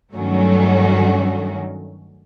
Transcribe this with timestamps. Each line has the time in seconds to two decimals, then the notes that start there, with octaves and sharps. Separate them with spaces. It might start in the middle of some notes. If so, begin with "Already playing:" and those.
0.15 G2 D#3 F#3 A3 C#4 F#4